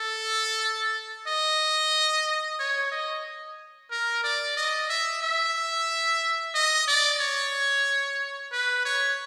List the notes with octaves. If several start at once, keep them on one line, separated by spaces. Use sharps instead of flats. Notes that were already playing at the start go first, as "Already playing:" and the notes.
Already playing: A4
D#5
C#5
D#5
A#4
D5
D#5
E5
E5
D#5
D5
C#5
B4
C#5